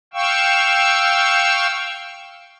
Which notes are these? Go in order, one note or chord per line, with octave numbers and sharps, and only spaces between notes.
F5 G5 C#6 E6